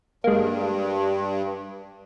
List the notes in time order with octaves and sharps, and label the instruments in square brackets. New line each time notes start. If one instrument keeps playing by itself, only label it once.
[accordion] G2 [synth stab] G#3 A#3